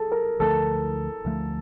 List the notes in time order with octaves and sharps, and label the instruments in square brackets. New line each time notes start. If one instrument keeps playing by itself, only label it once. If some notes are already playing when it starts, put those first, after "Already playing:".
Already playing: [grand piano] G#4 A4
A#4
[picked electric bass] D2 D3 F3 A3 [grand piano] A4
[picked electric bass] D2 D3 F3 A3